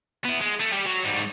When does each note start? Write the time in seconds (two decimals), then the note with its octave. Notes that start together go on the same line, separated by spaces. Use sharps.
0.24 B3 E4
0.41 G#3
0.60 A3
0.72 G3 G4
0.85 F#3
1.04 G#2 G3